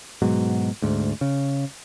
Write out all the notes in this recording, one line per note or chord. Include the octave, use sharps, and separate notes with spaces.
G#2 B2 F#3
D2 G#2
C#3